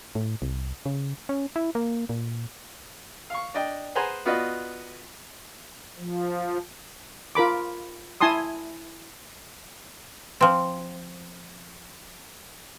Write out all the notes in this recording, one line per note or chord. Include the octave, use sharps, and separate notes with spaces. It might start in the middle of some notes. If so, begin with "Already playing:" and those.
A2
C2
C#3
C#4
E4
A#3
A#2
F5 C#6
D4 D5 D#5 G5
G#4 B4 C5 F#5 G#5 A#5
B3 F4 F#4 B4 D5 D#5
F3
F4 A#4 B5 D6
E4 G#5 A5 C6 D#6
F3 C4